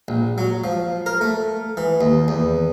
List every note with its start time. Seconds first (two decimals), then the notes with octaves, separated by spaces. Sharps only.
0.08 A#1
0.38 F#3
0.64 F3
1.06 A#4
1.21 A3
1.77 E3
2.01 D#2
2.28 E2